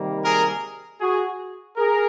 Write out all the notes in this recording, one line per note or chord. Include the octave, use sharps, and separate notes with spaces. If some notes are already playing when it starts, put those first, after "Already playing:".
Already playing: C3 D#3 G3 A#3
G#4 A#4
F#4 G#4
G#4 A#4